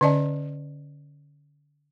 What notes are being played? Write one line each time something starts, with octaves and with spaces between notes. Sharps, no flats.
D3 C#4 D5 D#5 A5